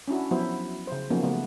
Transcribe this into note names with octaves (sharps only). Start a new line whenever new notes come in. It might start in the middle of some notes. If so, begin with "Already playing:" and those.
C#4 D4 E4 F#4
F3 F#3 B3 E4 C5
C#3 C5
F3 F#3 A#3 B3 C#4 D#4
C#3 A3 B3